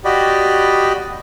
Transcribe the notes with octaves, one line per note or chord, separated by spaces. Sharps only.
F#4 G4 D5 D#5 B5